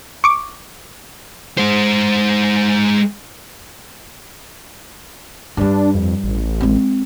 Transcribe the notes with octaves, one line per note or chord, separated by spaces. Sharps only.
C#6 D6
G#3 C5
G2 G3 D4
F2
A1
G#3 C4